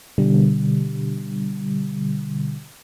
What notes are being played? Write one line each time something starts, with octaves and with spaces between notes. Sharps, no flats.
B2 D3 G3